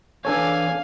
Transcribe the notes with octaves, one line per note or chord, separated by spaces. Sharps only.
E3 D4 A4 C#5 F5 G#5